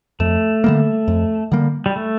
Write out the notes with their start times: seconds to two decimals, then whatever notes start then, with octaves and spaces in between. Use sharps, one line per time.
0.20 F2 A3
0.64 D3 G3 A#3
1.08 F2
1.52 D3 G3 A#3
1.86 G3
1.96 A3